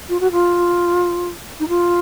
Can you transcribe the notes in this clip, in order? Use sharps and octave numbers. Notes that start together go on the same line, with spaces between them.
F4
F#4
F4
D#4
F4